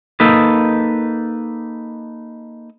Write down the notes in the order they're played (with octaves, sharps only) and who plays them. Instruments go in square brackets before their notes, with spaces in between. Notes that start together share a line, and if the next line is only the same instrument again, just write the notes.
[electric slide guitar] A#3 D#4 A4 B4